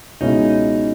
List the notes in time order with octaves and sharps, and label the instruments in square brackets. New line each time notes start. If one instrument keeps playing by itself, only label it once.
[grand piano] C#2 B2 G#3 C#4 E4 [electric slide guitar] D#4